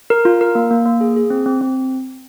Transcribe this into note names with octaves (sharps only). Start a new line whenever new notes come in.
A#4
F4
A#4
A#3
A#3
A#3
G#4
G#4
C4
C4
C4